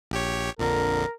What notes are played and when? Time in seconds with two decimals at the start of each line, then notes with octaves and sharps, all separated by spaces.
0.11 A#1 G4 C#5
0.59 A#1 F2 D3 A#4